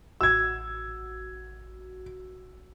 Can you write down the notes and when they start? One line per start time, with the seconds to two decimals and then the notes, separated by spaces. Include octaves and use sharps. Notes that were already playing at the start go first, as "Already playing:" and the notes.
0.21 A1 F#4 E6 G#6